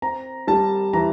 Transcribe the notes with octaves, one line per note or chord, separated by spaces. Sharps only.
C4 A#5
G3 A5
E3 A#5